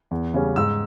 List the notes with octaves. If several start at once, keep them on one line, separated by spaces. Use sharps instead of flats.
E2
C#3 G3 C#4
G#2 E6